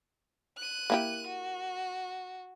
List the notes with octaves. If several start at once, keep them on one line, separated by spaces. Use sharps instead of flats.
F#6 D#7
A#3 E4 G4
F#4